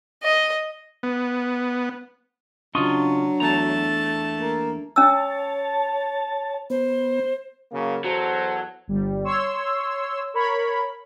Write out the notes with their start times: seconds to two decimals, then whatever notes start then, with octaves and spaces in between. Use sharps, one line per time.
0.23 D#5
1.03 B3
2.75 C#3 F#3 D4 F4 D#5 C6 C#6
3.40 E2 A3 A5 A#5
4.36 A#3
4.96 C#4 C#5 A5 E6
6.70 B3 C5
7.72 C#3 F#3 A#3
8.04 E2 F#3 A4 C5
8.87 G1 G3
9.24 C#5 C6 E6
10.34 A#4 C#5 B5